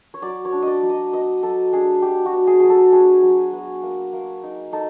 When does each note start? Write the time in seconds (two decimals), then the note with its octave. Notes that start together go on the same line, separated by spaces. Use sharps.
0.14 C#5
0.22 F#3 D5
0.45 C#5
0.52 D4
0.62 D#5
0.67 D5
0.83 F#3
0.90 D#5
1.13 B3 D#5
1.43 F#3 A4
1.73 D4 G#4
2.02 F#3 G4
2.25 F#4
2.33 B3
2.47 G#4
2.60 F#3 G#4
2.70 A4
2.92 D4 G#4
3.23 F#3
3.53 B3
3.83 A#3
4.13 A#3
4.43 D#4
4.73 D#4 A4